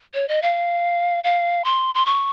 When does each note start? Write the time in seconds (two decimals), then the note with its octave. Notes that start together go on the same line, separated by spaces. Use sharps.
0.14 C#5
0.28 D#5
0.42 F5
1.24 F5
1.65 C6
1.95 C6
2.06 C#6